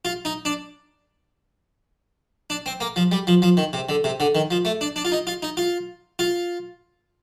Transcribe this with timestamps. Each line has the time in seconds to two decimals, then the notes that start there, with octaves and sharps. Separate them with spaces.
0.05 F4
0.25 D#4
0.45 D4
2.50 D4
2.66 C4
2.80 A#3
2.96 F3
3.12 G3
3.27 F3
3.42 F3
3.57 D#3
3.73 C3
3.89 D3
4.04 C3
4.20 D3
4.35 D#3
4.51 F3
4.65 A3
4.81 D4
4.96 D4
5.05 F4
5.12 D#4
5.27 F4
5.42 D#4
5.57 F4
6.19 F4